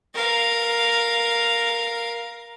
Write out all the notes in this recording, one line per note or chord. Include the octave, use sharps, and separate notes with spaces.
A#4 F5